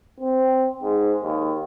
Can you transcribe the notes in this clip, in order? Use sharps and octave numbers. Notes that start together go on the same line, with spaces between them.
C4
G#2
D#2